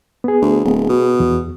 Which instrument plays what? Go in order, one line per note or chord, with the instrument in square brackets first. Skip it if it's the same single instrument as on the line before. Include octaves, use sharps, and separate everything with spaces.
[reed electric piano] B3 G#4
[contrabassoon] D2
D1
B2
[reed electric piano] E2